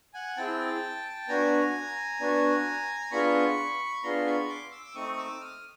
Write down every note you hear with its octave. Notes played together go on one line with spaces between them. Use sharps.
F#5 G#5
C4 E4 G#4 G5 A5
B3 D4 F#4 G#5 A#5
B3 D4 F#4
B3 D4 F4 G#4 B5 C#6
B3 D4 F4 G#4 A#5 C6
B5 C#6
C6 D6
D6 E6
E6
A3 C4 D#4 C#6 D#6
D6 E6
D#6 F6